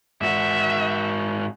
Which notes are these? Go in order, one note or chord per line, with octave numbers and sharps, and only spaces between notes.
G#2 F#4 E5